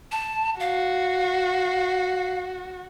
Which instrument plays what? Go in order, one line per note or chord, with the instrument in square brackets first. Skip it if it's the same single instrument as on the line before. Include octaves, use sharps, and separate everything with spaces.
[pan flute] A5
[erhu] F#4 [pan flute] F5